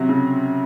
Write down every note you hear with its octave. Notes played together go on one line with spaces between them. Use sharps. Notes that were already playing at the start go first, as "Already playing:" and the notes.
Already playing: C3 F#3
C#3